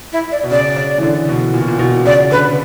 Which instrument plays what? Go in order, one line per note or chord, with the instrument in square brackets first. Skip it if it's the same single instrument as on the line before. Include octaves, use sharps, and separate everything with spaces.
[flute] E4
D5
[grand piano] B2
[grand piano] C#3 [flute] D5
[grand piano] C#3
E3
D3
B2
A#2
B2
A#2
B2
[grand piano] C#3 [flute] D5
[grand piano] D3 [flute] B4